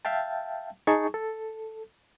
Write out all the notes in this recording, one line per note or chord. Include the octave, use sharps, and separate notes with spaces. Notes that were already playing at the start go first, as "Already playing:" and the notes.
E5 F5 G5 A5
D#4 G#4 A5 C#6
A4